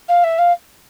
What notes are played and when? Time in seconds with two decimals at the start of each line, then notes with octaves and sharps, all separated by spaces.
0.09 F5
0.24 E5
0.39 F5